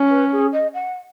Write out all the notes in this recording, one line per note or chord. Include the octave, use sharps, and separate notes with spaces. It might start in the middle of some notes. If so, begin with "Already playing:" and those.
Already playing: C#4
B4
G#4
D#5
F#5